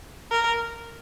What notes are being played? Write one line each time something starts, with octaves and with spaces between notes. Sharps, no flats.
A#4